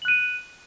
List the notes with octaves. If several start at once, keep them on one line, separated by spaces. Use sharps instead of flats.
F#6 D#7 F#7